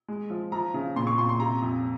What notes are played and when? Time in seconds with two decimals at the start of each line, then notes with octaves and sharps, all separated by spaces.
0.08 G#3
0.30 F3
0.52 F3 A#5
0.74 C#3
0.96 A#2 C6
1.07 C#6
1.18 A#2 C6
1.29 C6
1.40 C3 A#5
1.62 F2